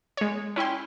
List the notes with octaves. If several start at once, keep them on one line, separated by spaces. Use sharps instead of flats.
G#3 C#5
C#4 E4 G5 C6